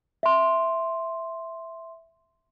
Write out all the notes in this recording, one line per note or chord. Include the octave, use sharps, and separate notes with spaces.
E5 C6